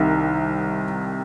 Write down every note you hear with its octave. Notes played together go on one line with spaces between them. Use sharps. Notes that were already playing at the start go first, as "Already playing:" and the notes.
Already playing: C2 C3 D#3